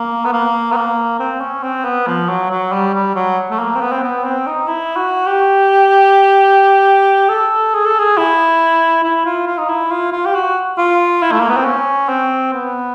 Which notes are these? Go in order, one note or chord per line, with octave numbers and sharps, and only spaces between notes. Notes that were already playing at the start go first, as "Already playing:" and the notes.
Already playing: A#3
B3
A#3
B3
A#3
C4
C#4
C4
B3
F3
F#3
F#3
G3
G3
F#3
A3
A#3
C4
B3
C4
B3
C4
D#4
E4
F#4
G4
A4
G#4
A4
G#4
E4
E4
F4
F4
D#4
E4
F4
F4
G4
F#4
F4
E4
A3
A#3
B3
C4
C#4
C4
B3